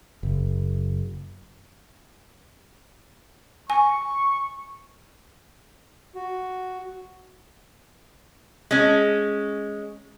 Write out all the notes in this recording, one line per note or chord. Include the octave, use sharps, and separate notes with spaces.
F#1
G#5 C#6
F#4
G#3 C#4